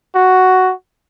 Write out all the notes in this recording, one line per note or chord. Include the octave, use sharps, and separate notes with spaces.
F#4